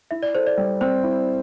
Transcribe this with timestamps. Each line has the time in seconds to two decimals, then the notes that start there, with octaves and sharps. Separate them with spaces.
0.11 E4 E5
0.23 D5
0.35 A4 C5
0.47 D5
0.57 G3
0.81 C4 C5
1.03 E4